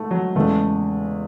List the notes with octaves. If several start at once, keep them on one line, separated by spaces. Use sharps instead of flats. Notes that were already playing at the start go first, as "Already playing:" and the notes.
Already playing: G#2 A3
F#3
E2 C#3 G#3 A3